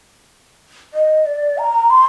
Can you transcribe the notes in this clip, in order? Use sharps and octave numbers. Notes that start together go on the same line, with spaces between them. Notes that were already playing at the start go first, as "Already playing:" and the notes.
D#5
D5
A#5
C6